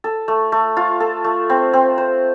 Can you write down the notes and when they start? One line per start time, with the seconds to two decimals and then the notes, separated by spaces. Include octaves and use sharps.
0.04 A4
0.28 A3
0.52 A3
0.77 F4
1.00 A4
1.24 A3
1.50 C4
1.73 C4
1.98 C5